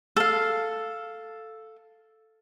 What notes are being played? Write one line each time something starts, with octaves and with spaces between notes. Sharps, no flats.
A4 F5